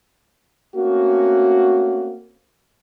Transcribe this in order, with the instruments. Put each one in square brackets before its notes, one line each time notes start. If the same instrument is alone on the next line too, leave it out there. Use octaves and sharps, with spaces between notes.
[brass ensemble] A3 A#3 C4 C#4 F#4